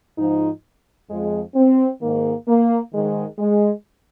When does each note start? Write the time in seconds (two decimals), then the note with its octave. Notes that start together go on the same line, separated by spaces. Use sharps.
0.17 G#2 F3 D#4
1.09 F2 F3 G#3
1.55 C4
2.01 G#2 D#3 A#3
2.47 A#3
2.93 G#2 D#3 G#3
3.38 G#3